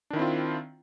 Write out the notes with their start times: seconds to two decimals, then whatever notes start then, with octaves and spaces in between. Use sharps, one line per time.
0.11 D4
0.13 D#3
0.16 E4
0.19 C4
0.22 F4